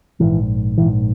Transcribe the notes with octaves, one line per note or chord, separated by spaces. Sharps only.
A#1 G#2 E3
A#1 G#2 E3